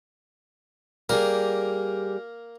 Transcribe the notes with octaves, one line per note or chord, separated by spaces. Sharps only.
G3 A#3 G#4 A#4